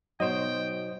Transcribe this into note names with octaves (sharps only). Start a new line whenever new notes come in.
B2 F#3 D#4 C5 D#5 G5